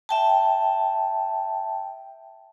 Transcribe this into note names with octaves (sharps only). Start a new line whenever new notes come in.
E5 G5 A5